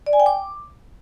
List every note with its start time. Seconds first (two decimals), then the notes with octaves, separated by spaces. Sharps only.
0.06 D5
0.13 G#5
0.20 G5
0.26 D6